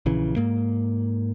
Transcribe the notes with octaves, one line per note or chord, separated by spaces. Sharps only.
A#1 C#3 E3
G#2 A#3